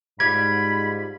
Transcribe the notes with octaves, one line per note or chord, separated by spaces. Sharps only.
G#2 G3 F4 B5 G#6